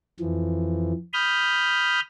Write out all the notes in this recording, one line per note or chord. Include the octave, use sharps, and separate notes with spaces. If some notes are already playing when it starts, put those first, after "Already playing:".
F2 E3 F3
B5 D#6 F6 G6